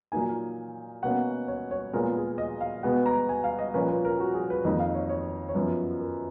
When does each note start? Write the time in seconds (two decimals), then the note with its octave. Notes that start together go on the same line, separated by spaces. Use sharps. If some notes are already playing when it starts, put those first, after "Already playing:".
0.12 A#2 F#3 A#3 D#4 G#5
1.03 B2 A#3 C#4 F#5
1.48 C#5
1.71 C#5
1.93 A#2 G#3 B3 A#4
2.16 G#4
2.38 D#5
2.61 F5
2.83 B2 G#3 B3 F#5
3.06 A#5
3.29 G#5
3.44 F5
3.59 D#5
3.74 A#2 F3 A#3 C#4 B4
3.89 B4
4.05 A#4
4.20 F#4
4.34 G#4
4.50 B4
4.65 F2 D#3 A#3 D#4 D#5
4.80 F5
4.94 C#5
5.09 C#5
5.49 C#5
5.54 F#2 F3 B3 B4
6.00 A#4